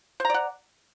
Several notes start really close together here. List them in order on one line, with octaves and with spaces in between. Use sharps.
C5 A#5 D5 F#5